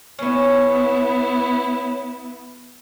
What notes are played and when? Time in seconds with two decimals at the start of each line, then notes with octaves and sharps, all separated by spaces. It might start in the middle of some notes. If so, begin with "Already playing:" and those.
0.19 B3 C#4 E4 C#5